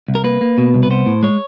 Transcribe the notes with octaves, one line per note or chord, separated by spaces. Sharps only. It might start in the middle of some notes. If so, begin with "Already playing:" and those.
C2
A#4
A#3 B4
A#3
B2
C2
B4
B3 C5
A2
G#3 C#5